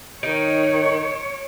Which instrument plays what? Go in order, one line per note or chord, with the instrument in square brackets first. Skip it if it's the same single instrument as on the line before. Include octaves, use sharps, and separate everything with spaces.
[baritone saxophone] D#3 [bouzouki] D#4 [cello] C#5 [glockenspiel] D7